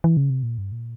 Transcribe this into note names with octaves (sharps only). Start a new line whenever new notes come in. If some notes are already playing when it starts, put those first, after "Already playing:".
E3
C#3
C3
A#2
G2
A#2